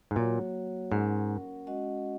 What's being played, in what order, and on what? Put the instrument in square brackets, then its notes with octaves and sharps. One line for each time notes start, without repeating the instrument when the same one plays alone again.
[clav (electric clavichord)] G#2
[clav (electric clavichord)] A#2 [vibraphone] F#3 A#3 F#4 C#5 F#5
[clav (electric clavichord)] G#2 [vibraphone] C#4 A#4 F#5
[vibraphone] G#3 C#4 F#4 D#5 F#5